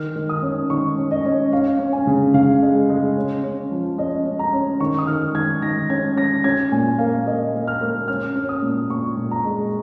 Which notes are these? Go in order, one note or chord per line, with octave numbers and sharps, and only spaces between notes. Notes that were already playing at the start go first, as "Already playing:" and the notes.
Already playing: D#3 F6
D#3
D#6
C#4
D#3 C#6
C#4
D#5
C#4
C#4 F5
C#4
G#5
C#3
C#3 F5
G#3
G#3
C#4
C#4
F3
C#4 D#5
C#4
A#5
C#4
D#3 C#6
D#6
D#3 F6
D#3 G#6
D#3 A#6
C#4 G#6
C#4 A#6
C#4 G#6
A#2 G#5
A#3 F5
A#3 D#5
A#3
F6
A#3
C#4 F6
C#4
D#6
A#2
A#2 C#6
A#2
A#5
G#3